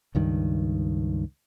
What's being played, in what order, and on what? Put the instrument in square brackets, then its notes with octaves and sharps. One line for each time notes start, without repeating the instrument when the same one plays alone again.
[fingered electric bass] C#2 G2 D#3